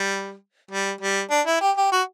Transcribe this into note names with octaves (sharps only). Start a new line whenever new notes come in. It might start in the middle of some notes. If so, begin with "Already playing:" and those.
Already playing: G3
G3
G3
D4
E4
G4
G4
F#4